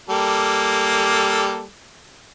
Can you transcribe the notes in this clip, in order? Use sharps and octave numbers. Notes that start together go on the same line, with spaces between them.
G3 A#3 A4